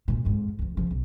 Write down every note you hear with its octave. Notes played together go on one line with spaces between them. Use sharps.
D2 A#2
F2 G#2
D2 F3
C#3 F3
B1